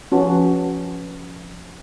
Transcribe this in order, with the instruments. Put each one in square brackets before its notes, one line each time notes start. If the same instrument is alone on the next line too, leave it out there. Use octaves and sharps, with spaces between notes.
[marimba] F3 B4 A5 [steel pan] C#4 F#4